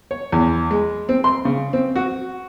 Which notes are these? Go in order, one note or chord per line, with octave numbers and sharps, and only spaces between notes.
C#5
E2
G#3
C4
C6
C#3
C4
F#4